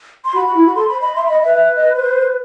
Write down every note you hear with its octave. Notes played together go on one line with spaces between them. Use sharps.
C6
F#4 B5
F#4
E4
F#4
A4 C6
C5 B5
D#5 B5
E5 C6
D#5 B5
B4 E5
E5
D#5
C5